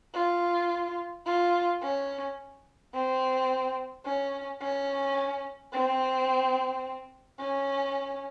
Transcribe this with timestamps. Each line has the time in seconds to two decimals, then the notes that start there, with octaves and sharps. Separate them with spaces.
0.14 F4
1.26 F4
1.82 C#4
2.94 C4
4.05 C#4
4.61 C#4
5.72 C4
7.40 C#4